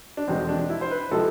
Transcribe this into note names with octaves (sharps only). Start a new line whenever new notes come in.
D4
F1 E2 B2 G#3 C4
D4
E4
C5
B4
C3 F3 G#3 A4